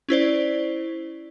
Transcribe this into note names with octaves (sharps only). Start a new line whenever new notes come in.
C#4 E4 C5 D5